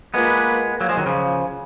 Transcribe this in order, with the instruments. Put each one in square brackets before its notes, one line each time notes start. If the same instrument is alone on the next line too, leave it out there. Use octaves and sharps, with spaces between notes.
[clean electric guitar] G#3 B3 [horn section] A#3 F4 B4
[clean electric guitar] F#3 A#3
F3 G#3
D#3 F#3
C#3 F3